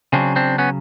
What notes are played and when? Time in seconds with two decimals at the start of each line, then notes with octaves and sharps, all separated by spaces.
0.13 C#3 F#3 C4 D4
0.36 C4 D4
0.58 B3 C#4